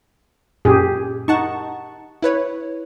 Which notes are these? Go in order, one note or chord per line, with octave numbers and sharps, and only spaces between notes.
F#2 A#2 G4 G#4
D#4 F#5 A5 C#6
E4 B4 C#5